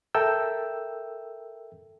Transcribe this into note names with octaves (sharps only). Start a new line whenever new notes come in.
A4 A#4 E5 G5 E6